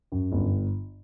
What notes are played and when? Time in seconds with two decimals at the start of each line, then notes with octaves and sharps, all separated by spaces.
0.12 F#2
0.32 G1